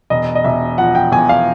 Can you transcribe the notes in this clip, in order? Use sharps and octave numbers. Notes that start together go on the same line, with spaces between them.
E1 D#5
D#5
E1 E5
F3 F#5
G5
E2 G#5
F5